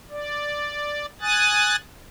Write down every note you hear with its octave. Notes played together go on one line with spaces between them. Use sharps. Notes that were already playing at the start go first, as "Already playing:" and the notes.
D5
G#5 D#6 F#6 A6